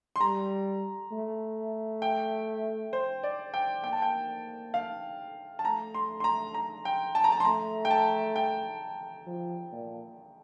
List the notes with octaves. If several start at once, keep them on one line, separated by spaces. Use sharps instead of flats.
C6
G3 A#5
A3
G5
C5
D5
G5
A#3 G5
A5
G5
F5
A5
A3 A#5
C6
C6
A#5
A#5
G5
A5
A#5
A5
C6
A3 A#5
G5
A5
G5
F3
A#2